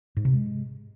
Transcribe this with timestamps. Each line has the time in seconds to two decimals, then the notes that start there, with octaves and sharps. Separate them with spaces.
0.17 G#2
0.25 C3
0.33 G#3